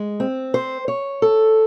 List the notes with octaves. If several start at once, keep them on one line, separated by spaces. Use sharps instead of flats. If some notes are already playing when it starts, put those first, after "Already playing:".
Already playing: G#3
C4
C5
C#5
A4